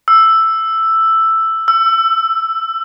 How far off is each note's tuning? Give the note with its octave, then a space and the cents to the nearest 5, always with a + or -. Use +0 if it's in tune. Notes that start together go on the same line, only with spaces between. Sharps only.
E6 +5
E6 +25